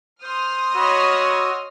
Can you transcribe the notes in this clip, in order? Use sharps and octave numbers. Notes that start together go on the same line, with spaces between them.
C5 C6 D#6 F6
F#4 C#5 D#5 B5 E6